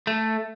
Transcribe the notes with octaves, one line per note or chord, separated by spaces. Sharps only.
A3